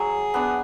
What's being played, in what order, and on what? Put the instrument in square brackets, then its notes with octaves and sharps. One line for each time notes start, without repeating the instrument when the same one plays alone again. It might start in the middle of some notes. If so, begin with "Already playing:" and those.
Already playing: [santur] F#3 [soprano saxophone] G#4
[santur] B3 D4